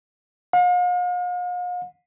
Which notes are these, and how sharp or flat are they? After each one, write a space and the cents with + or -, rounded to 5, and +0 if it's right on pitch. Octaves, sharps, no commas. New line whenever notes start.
F5 +45